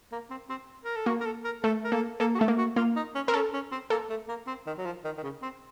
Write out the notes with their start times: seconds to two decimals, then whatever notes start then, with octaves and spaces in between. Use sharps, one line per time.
0.12 A#3
0.30 C4
0.49 C4
0.85 A#4
0.96 A4
1.06 A#3 F#4
1.21 A#4
1.25 A4
1.44 A#4
1.63 A3 A4
1.84 A#4
1.92 A#3 A4
2.20 A#3 A4
2.35 F#4
2.39 A3 A4
2.48 A#3
2.58 F#4
2.76 A#3 F4
2.96 D#4
3.15 C#4
3.27 C4 A#4
3.34 C#4 A4
3.53 C#4
3.72 C4
3.90 A#3 A4
4.09 A3
4.28 A#3
4.47 C4
4.67 D#3
4.78 F#3
4.85 F3
5.04 D#3
5.17 D#3
5.23 C#3
5.42 C4